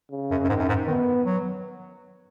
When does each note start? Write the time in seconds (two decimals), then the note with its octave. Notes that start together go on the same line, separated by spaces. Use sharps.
0.11 C#3
0.31 F#2
0.44 F#2
0.49 G#2 D#3
0.59 F#2
0.69 G#2
0.87 D#3 B3
1.26 F#3